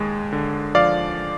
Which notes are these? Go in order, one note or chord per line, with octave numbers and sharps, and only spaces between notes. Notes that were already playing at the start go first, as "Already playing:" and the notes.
Already playing: D#2 G#3
D3
F3 D5 F5